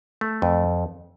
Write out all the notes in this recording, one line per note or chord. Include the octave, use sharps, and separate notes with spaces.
A3
F2